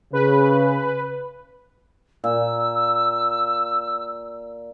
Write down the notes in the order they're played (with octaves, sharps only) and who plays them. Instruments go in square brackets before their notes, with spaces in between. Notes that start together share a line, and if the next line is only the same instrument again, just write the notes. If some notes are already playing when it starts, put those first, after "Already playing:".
[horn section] C#3 [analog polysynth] B4
[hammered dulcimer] A#2 [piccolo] E6